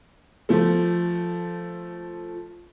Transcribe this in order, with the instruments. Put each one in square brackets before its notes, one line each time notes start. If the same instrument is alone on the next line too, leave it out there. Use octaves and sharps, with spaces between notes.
[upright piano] F3 A3